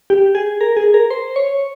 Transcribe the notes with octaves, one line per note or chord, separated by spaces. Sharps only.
G4
G#4
A#4
G#4
A#4
C5
C#5